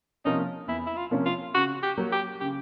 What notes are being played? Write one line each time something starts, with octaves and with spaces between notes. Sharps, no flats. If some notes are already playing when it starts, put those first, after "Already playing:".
C3 F3 A#3 C#4 D#4
E2 E4
E4
F4
C3 F3 A#3 C#4
F4
C#3 F#4
G4
F#3 A#3
G4
C#3 G4